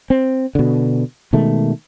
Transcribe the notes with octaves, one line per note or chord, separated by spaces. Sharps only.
C4
B2 D3
B2 D#3 G#3 A3